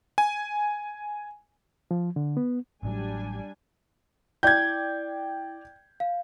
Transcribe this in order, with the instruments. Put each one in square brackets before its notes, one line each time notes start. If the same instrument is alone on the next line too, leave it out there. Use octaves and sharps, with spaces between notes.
[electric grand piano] G#5
[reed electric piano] F3
D3
B3
[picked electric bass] A1 A2 F#3 [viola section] G3 D4 G#5
[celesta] E4 [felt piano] D5 G5 [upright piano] G6 G#6
[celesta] F5